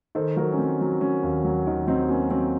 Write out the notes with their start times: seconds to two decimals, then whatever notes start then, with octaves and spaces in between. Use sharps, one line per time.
0.15 D#3 A4 C5
0.36 F#3 F#4 A#4
0.52 C#4
0.58 F#3 C4
0.81 F#3
1.01 F#3 C#4
1.23 D#2
1.44 F#3
1.67 D#3
1.87 F#3 C4 D#4
2.09 A#3 C#4
2.31 F#3 C4